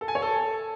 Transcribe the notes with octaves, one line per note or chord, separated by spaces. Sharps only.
A4
G#5
C#5
A4